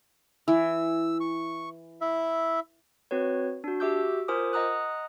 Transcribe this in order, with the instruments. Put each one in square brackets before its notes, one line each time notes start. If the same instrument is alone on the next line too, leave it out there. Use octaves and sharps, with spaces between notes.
[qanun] E3 [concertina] E6
[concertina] C#6
E4 E5
[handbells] C4 F#4 B4 C#5
D4 F#4
F#4 G4 E5 D6 E6 G6
F4 A#4 C5 G#5 D6 D#6
D#5 F#5 A#5 D#6 F#6